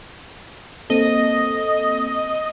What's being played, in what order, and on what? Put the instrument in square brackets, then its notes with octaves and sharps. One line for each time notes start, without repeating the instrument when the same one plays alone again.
[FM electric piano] A#3 C4 A4 [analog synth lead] D#5